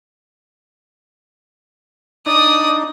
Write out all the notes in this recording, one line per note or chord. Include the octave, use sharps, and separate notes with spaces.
D4 D#4 D5 D#6